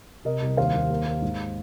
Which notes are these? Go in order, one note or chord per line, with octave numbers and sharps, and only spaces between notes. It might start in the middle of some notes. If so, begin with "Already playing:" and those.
C3 A#4 D#5
C2
D#2 C5 F5
D#2
A#3
A#3
G#2